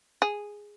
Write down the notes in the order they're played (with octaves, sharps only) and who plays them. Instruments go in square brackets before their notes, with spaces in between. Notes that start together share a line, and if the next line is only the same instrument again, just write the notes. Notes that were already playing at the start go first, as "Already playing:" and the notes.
[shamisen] G#4